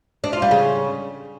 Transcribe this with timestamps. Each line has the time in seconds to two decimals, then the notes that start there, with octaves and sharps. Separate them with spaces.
0.24 D4
0.33 F4
0.42 G3
0.51 C#3